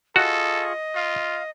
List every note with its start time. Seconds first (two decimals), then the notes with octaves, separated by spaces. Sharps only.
0.16 F4 F#4 G#4 A4 D#5 C#6
0.95 F4 F5